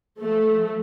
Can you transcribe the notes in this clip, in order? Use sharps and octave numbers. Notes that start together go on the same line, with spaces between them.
F3 A3